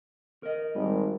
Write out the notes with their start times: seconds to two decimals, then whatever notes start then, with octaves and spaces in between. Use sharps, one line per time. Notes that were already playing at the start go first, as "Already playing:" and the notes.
0.43 A#4 D#5
0.75 G#1 G3